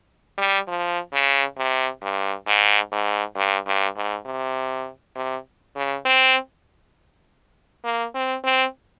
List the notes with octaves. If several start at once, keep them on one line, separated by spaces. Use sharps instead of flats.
G3
F3
C#3
C3
G2
G#2
G#2
G2
G2
G#2
C3
C3
C#3
C4
A#3
C4
C4